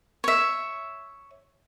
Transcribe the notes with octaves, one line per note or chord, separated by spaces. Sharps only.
C#5 E5